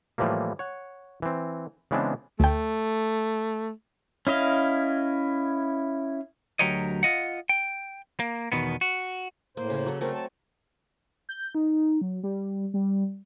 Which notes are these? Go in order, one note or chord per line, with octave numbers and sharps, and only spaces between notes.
A2 E3 F3 G3 A#3
C#5 F#5
E3 C4
C#3 E3 G#3 B3 C4 D4
D2 A3 G5
C#4 E4 D#5 F5
D2 F#3 G4 A#4 C#5 D#5
F4 D#5 F#5
G5
A#3
E2 B2 D#3 B3
F#4
A2 A#3 C5
C#3 A#3
F#3 A4
F#3 A3 C4 A#4
A5
G6
D#4
F#3
G3
G3